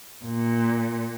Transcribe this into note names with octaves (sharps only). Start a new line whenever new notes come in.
A#2